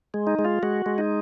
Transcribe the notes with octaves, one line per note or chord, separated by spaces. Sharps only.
G#3
D#4
G#3
F4
G#3 F#4
G#3
D#4